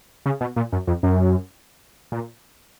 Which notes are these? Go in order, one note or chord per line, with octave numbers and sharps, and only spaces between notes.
C#3
B2
A#2
F#2
F2
F#2
A#2